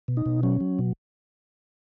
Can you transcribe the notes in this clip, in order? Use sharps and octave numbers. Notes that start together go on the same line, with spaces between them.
B2
D#4
B2
F#3 C#4
F#3
B2